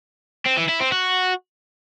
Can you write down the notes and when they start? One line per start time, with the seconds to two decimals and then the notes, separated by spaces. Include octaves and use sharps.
0.46 C4
0.58 E3
0.69 E4
0.81 C4
0.92 F#4